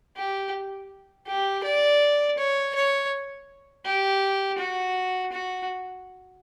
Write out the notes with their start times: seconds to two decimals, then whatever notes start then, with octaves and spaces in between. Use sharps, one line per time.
0.17 G4
1.26 G4
1.63 D5
2.38 C#5
2.75 C#5
3.85 G4
4.58 F#4
5.32 F#4